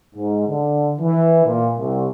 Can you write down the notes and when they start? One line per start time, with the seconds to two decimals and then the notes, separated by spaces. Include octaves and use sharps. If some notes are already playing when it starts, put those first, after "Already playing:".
0.16 G#2
0.48 D3
0.99 E3
1.46 A#2
1.78 C2